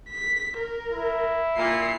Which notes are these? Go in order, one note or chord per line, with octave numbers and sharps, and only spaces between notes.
B6
A#4
E4
A#2 C7